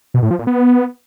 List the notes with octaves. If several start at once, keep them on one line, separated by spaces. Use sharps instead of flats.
B2
A2
F3
A#2
B3